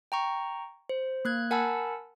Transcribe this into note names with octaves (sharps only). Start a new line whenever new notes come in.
G5 A#5 C#6
C5
A#3 F#6 G#6
A#4 F#5 G#5 A5 B5 E6